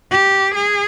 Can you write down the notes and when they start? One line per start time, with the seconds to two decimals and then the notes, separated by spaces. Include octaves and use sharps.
0.11 G4
0.55 G#4